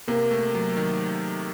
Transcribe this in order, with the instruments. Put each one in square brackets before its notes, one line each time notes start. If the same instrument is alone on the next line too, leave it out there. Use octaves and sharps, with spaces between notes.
[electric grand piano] C3 [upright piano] A#3
[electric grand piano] A3
F#3
D#3